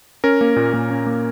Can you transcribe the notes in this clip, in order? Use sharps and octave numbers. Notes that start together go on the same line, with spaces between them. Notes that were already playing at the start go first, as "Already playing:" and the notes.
C#4 A#4
A#3
A#2
A#2
C#4
A#3